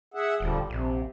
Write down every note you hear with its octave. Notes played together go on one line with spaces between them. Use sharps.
G#4 E5 F#5
D#1 D3 F3 G3
A#1 C3